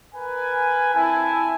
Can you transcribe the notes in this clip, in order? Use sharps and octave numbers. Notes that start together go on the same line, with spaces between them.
A#4 B4 G#5
C4 E4 G#5 A5